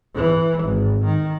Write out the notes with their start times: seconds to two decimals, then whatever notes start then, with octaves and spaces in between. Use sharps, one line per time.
0.15 E3
0.64 G#1
1.05 D#3